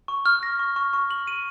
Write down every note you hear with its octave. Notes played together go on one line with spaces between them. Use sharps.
C#6
F6
A#6
C#6
C#6
C#6
F#7
D#7